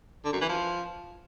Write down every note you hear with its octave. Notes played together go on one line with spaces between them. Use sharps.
D3
F#2
E3
F3